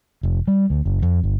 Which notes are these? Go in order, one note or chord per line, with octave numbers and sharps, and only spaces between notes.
F1
G3
D2
F#1
F2
G1